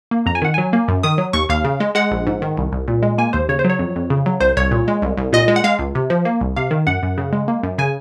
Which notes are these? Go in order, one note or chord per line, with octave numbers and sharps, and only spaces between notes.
A#3
F2 A#5
G#5
D#3 F#5
F#3 G#5
A#3
F#2
D#3 D#6
F#3
D#2 C#6
D#2 F5
C#3
G#3
G#3 F#5
A#1
G#2
D#3
C2
C2
A#2
G#3
A#3 G#5
D#2 C5
C#3 C#5
C5
F#3
C#5
F2
F2
C#3
F#3
C2 C5
C2 C#5
A#2
G#3
C2
C2
A#2 D#5
G#3
F#5
G#3 F5
C#2
C3
F3
A#3
C2
C3 F5
D#3
F#2 F#5
F#2
C#3
G#3
A#3
F#2
C#3 G#5